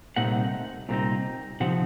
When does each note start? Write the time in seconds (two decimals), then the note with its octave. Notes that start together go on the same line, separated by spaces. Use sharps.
0.16 C2 A#2 A3 C4 D#4 F#5
0.89 C2 A#2 A3 C4 D#4
1.60 C3 F3 C4 D#4 F#5